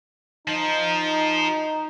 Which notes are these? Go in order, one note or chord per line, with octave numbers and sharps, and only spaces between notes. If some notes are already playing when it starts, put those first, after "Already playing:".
F3 D#4